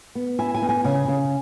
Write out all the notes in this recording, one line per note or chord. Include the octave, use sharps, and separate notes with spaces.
B3
E4 G#5
G#5
B3
G#5
C#3 G#5
C#3